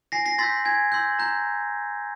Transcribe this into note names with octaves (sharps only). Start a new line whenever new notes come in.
G#5 A#6 C7
A#6 C7
C6 E6 G6 A6 B6
G#5 G#6
C6 E6 G6
A#5 G6